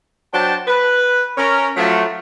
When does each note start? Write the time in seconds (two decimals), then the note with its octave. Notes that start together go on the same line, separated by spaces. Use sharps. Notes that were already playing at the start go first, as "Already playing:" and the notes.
0.33 F#3 D4 C5 F#5 G5 A5
0.67 B4
1.37 C#4 A#4
1.76 F3 F#3 A3